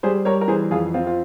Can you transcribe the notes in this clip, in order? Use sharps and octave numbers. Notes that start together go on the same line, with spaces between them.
G3 G#4 C5
G3 A#4 C#5
A#4
E3 G#4 C5
F2 F4 G#4
C4 F4
F4